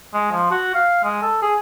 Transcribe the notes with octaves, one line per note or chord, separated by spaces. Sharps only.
G#3
F3
F#4
F5
G#3
A4
G#4